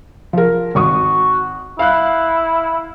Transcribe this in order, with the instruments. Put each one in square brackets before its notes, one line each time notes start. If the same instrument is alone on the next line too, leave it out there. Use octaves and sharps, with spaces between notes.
[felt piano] F3 A#4
[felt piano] G#1 C#6 D#6 [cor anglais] F#4
[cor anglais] E4 [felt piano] F5 F#6